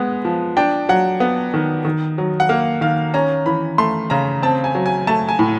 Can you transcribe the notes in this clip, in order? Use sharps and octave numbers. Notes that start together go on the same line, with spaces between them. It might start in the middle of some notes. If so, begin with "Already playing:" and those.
Already playing: G#3 B3
F3
D4 G5
F#3 F#5
B3
D#3
D#3
F#3
F#5
A#3 F5
D#3 F5
C#4 A#5
E3 B5
A3 C6
C#3 A#5
C4 A5
G#5
F#3
G#5
A3 A5
G#5
A2